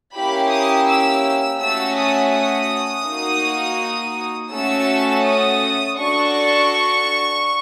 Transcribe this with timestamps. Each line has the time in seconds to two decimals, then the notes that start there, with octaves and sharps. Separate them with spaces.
0.15 A#3 C#4 E4 G4 B5
0.51 D#6
0.88 E6
1.61 A3 C#4 F#4 E6
1.97 D#6
2.34 D#6
3.07 A#3 D#4 F#4
4.53 A3 C#4 F#4 A4 E6
5.25 D#6
5.98 D4 F#4 A4 C#6